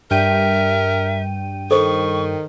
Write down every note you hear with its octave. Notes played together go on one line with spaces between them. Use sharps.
G2 A#4 E5 G5 D#7
D#3 A4 C5 C#6